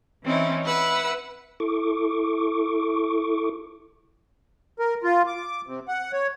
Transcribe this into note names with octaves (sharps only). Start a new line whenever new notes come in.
E3 C4 C#4 D#4 E4
E4 B4 F#5 E6
E4 A4 C#6 D6
A#4
F4
D6
C3
F#5
C#5